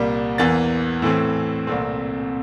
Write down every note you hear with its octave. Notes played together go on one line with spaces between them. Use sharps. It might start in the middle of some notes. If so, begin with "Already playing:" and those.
Already playing: C2 A#2 G3 A#3
E2 E3 A#3 A6
A2 E3 A3 C4
C2 A#2 A3 C4